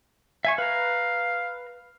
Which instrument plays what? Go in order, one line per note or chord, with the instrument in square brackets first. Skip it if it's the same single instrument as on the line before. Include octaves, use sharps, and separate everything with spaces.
[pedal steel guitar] E5 G#5 C#6
[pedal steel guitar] B4 A#5 [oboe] F5